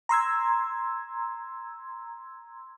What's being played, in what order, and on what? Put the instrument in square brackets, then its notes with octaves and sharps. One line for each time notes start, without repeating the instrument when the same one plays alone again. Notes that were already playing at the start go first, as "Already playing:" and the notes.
[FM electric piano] A#5 C6 E6 G#6